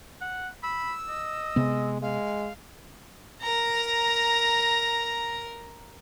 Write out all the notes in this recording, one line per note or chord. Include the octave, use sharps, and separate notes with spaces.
F#5
B5 E6
D#5
C3 G#3 B3
G#3 F5
A#4 A#5